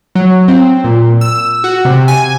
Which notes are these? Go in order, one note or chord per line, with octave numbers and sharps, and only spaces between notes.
F#3
C4
A#2
E6
F#4
C3
G#5